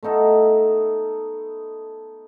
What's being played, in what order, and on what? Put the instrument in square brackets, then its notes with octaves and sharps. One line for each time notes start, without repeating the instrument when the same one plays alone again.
[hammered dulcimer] A3 B3 D#4 A4